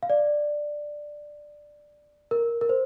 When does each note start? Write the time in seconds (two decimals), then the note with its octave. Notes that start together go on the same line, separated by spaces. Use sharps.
0.03 F5
0.10 D5
2.31 A#4
2.61 A#4
2.69 C5